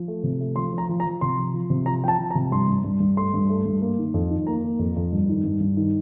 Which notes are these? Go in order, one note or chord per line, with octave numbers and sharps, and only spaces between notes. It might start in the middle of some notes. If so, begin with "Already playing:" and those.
Already playing: F3
A3
C3
A3
F3 C6
F3
A#5
F3
A#5
F3
C3 C6
F3
F3
C3
F3 A#5
F3 G5 A5
F3
A#5
C3
G2 C6
G2
G2
G2
A3 C6
G2
A3
G2
A#3
D#3
F2
D#3
A#3 A#5
A#3
F2
F2
G2
D#3
G2
G2
D#3